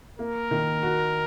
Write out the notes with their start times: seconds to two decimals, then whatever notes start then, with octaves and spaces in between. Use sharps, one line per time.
0.19 A#3 A#4
0.51 D#3
0.83 F#4